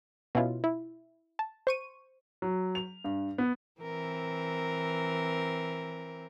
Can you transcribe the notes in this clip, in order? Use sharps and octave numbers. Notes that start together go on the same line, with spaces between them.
B2 C#4 E4 F4
E4
A5
C5 C#6 D#7
F#3
F7
G2
B3
E3 C4 A#4